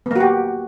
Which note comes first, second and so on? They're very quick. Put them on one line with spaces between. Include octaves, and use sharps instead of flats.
B3 A#3 F#4 G4